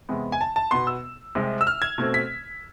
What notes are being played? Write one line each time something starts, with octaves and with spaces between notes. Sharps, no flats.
E2 C3 G#3 B3
G#5
A5
A5
B2 B3 C6
E6
C2 C3 G#3 C4
E6
F6
G#6
B2 A3 C4
B6